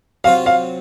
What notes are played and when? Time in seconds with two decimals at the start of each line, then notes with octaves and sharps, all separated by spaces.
0.24 C3 F#3 C4 F4 F5
0.46 F5